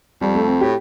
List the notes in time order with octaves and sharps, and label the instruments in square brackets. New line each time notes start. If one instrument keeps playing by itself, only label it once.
[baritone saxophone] F2 [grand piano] G3
[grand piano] A3
C4
[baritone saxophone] A2 [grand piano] G4